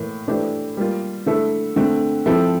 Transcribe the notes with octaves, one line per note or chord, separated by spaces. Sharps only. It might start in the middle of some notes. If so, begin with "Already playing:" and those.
Already playing: A2 E3 A#3
E3 A3 D4 G4 C5
G3 A#3 F4
D3 A3 E4 A4
D3 A3 C4
F3 C4 E4 A4